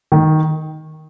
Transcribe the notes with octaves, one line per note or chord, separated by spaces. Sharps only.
D#3